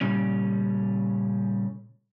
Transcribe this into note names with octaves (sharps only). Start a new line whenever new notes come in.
A#2 C#3 G3 C#4